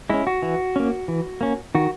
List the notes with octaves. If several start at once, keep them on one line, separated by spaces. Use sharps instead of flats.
G#3 C#4 E4
F#4
E3
A#3 C#4
E3
A#3 C#4
D#3 F#4